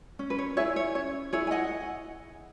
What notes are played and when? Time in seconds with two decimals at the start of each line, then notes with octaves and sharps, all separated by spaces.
0.19 C#4
0.30 B4
0.38 C#5
0.57 E4 G#4 C#5 E5
0.76 C#5
0.95 C#4 C#5
1.33 E4 G#4 C#5
1.47 G#5
1.51 D#5 F#5